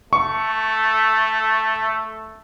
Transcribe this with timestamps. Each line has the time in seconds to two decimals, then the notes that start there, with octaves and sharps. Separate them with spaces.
0.13 A3 C#6